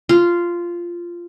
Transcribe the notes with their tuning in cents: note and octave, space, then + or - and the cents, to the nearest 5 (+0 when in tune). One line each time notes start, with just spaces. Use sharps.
F4 -10